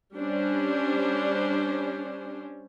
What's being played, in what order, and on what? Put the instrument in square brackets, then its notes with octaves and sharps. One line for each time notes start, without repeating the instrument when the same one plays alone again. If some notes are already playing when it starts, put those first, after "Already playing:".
[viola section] G3 C#4 D4 C5